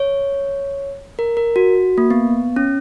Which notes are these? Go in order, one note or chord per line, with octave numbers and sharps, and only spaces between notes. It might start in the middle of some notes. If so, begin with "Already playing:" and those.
Already playing: C#5
A#4
A#4
F#4
A#3
B3
C#4